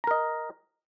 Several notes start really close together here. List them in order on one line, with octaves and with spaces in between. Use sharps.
A#5 A#4 D#5